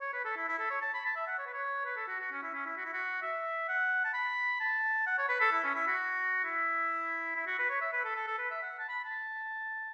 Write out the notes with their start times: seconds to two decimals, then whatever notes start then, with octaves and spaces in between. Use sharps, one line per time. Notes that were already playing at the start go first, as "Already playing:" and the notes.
0.01 C#5
0.13 B4
0.25 A4
0.36 E4
0.48 E4
0.59 A4
0.70 C#5
0.82 A5
0.94 B5
1.05 A5
1.16 E5
1.27 F#5
1.39 C#5
1.46 B4
1.54 C#5
1.85 B4
1.97 A4
2.08 F#4
2.20 F#4
2.32 C#4
2.43 E4
2.54 C#4
2.66 E4
2.77 F#4
2.85 E4
2.93 F#4
3.22 E5
3.69 F#5
4.04 A5
4.14 B5
4.60 A5
5.06 F#5
5.18 C#5
5.29 B4
5.41 A4
5.52 E4
5.64 C#4
5.75 E4
5.87 F#4
6.44 E4
7.36 E4
7.47 F#4
7.59 B4
7.70 C#5
7.81 E5
7.93 B4
8.04 A4
8.16 A4
8.27 A4
8.39 B4
8.51 E5
8.62 F#5
8.79 A5
8.89 B5
9.04 A5